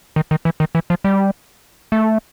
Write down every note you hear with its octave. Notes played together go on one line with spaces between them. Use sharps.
D#3
D#3
E3
D#3
E3
F3
G3
A3